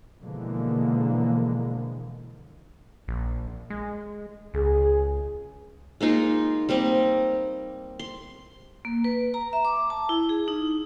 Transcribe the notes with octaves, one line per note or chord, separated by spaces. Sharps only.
B2 D3 E3 F3 G#3 A#3
A#1
G#3
C#2 G#4
G#3 A#3 D#4 F4
G3 A#3 C4 D#5
C6
A#3
B4
A#5
E5
D6
A5
E4
G#4
D#4